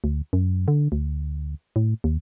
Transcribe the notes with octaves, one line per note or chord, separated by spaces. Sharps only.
D2
F#2
D3
D2
A2
D#2